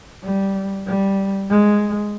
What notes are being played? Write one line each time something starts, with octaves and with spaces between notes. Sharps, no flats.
G3
G3
G#3